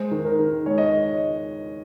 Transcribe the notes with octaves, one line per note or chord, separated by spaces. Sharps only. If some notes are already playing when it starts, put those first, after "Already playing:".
Already playing: G#3 C5
D#3
A#4
D#3
G#3 C#5
D#5